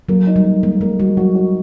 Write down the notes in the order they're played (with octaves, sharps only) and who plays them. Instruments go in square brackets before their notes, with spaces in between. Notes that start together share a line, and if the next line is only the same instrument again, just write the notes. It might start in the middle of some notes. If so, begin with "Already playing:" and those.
[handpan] F#3 [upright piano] A#3
[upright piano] D#4
[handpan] G3
[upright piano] A#3
[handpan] G#3 [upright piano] A#3
[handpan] G#3 [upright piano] A#3
[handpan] G3 [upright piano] F#4
[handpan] F#3 [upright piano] F#4
[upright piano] F#4